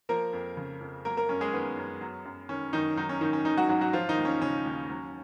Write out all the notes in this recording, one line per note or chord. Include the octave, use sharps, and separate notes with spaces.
F3 A#3 A#4
F2
C#3
F2
F#3 A#3 A#4
A#3 A#4
F#2 C#4
G#3 G#4
D#3 B3
F#2
F#3
F#2
D#3 C#4
F#2 D#3 D#4
D#3 F#3 D#4
C#4
G#2 D#3 D#4
C#4
D#3 D#4
F#3 F#4
G#2 F#3 F#4
F#3 F#4
F3 F4
D#3 D#4
D#2
C#4
C#3 C#4
D#2
F#3